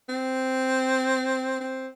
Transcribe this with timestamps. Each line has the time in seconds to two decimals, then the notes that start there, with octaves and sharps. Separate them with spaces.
0.09 C4
1.60 C4